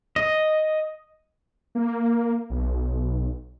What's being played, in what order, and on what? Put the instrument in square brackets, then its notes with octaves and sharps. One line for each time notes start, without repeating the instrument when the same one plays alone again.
[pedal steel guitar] D#5
[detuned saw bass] A#3
B1